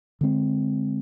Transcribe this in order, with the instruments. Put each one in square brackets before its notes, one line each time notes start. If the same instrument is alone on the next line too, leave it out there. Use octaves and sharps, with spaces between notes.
[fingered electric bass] D3 G#3 C4